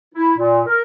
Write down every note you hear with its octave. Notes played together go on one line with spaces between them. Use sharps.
E4
A#2
A#4